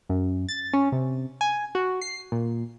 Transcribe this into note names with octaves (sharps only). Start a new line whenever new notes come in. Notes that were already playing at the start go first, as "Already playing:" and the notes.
F#2
A6
C#4
C3
G#5
F#4
C7
A#2